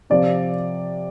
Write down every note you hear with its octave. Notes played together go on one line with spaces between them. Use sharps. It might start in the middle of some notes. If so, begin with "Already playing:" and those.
C3 F3 C4 D5